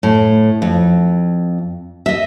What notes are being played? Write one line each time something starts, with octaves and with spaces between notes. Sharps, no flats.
A2
F2
D#5 E5